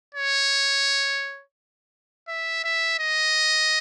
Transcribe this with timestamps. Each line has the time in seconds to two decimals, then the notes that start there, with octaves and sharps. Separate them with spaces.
0.15 C#5
2.28 E5
2.64 E5
3.00 D#5